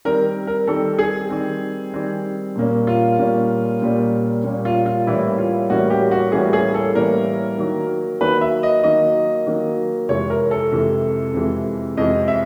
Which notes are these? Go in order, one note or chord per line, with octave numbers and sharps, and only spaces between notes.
D#3 G3 C4 A#4
A#4
D#3 G3 C4 A4
G#4
D#3 G3 C4
D#3 G3 C4
A#2 G3 A#3 C#4
F4
A#2 G3 A#3 C#4
A#2 G3 A#3 C#4
A#2 G3 A#3 C#4
F4
F4
A2 E3 G3 A#3 C#4 E4
F4
A2 E3 G3 A#3 C#4 F#4
G4
F#4
A2 E3 G3 A#3 C#4 G#4
G#4
A4
A2 E3 G3 A#3 C#4 A#4
D#3 F#3 A#3
D#3 F#3 A#3 B4
E5
D#5
D#3 F#3 A#3 D#5
D#3 F#3 A#3
F2 C3 E3 G#3 C#5
A#4
A4
F2 C3 E3 G#3
F2 C3 E3 G#3
F2 C3 E3 G#3 D#5
E5